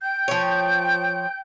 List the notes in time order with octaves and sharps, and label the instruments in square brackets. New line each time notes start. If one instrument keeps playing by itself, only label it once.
[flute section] G5 G6
[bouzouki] F3 C#5